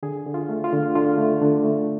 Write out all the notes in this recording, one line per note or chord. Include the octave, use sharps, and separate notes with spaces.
D3 G#4
D3
F4
A3
F4
D3
D3 F4
A3
D3
A3